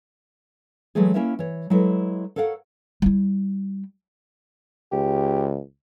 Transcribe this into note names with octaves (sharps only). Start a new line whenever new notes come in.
E3 F#3 G#3 A3 G#4
A#3 C#4 E4 A#4 C#5 E5
E3 C#5
F#3 G#3 E4 A4 B4
A4 A#4 C#5 F5 F#5
G3 E4
C#2 G4